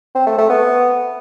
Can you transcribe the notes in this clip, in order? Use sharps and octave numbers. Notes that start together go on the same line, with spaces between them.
C4
A3
A3
B3